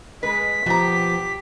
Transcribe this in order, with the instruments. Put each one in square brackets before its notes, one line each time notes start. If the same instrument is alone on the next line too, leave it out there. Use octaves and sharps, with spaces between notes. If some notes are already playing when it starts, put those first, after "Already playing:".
[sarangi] G#3 [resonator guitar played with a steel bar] B4 [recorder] B6
[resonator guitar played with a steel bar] B2 A#5 [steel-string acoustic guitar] F3 B3 [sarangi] G4